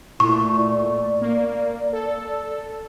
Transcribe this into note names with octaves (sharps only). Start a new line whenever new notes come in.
A#2 A3 E4 C#6
D5
A#3
A4